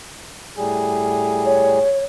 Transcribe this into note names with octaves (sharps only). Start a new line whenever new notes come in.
A2 G3 G#4
C#5